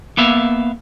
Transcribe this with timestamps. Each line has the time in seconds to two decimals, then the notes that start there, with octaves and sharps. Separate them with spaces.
0.17 A#3 B3 E5 F5